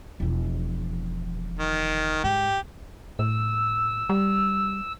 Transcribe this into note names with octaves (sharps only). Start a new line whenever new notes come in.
E1 F3
D#3
G#2 G4
A2 E6
G3